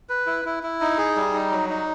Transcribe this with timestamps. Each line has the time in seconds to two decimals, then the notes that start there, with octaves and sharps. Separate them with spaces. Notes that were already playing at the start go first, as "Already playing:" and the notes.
0.09 B4
0.27 E4
0.45 E4
0.63 E4
0.81 D#4
0.98 G#4
1.16 G3
1.34 D#4
1.51 F#3
1.69 D#4